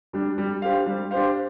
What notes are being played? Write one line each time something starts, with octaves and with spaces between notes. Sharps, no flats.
G3 D4
G3
D4 G4 C5 F5
G3
D4 G4 C5 F5